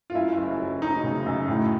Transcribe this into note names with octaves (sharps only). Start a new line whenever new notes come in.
F4
F#2 E4
F#1
F#3
F#3 D#4
C#3
F#2
A2